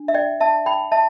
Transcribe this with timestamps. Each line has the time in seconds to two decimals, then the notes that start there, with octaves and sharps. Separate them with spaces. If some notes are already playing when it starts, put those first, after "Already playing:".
Already playing: D4
0.08 E5
0.14 D5 G5
0.40 E5 A5
0.66 G5 B5
0.92 E5 A5